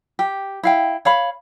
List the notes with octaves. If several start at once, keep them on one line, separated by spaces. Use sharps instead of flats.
G4
E4 F5 G5
C#5 F5 B5